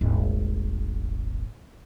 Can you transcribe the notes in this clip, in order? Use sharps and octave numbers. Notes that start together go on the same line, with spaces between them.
D#1 G#1